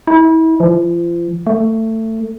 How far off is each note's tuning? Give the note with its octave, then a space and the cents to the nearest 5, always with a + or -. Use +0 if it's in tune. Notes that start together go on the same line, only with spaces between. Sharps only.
E4 -35
F3 -35
A3 +20